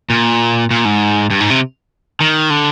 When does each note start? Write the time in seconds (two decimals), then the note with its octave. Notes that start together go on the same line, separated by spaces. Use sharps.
0.10 A#2
0.71 A#2
0.85 G#2
1.30 G2
1.40 G#2
1.50 C3
2.21 D#3
2.50 D3